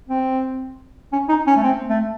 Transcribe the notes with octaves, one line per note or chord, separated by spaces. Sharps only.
C4
C#4
D#4
C#4
A3
C4
A3